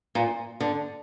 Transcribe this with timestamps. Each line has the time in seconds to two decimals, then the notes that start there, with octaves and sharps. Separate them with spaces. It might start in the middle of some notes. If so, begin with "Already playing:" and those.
0.15 A#2
0.60 D3